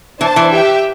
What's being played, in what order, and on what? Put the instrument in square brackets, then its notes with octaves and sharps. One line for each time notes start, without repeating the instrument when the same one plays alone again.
[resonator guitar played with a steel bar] E3 [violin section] D4 C5 A5
[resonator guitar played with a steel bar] E3
[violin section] G4 E5 G5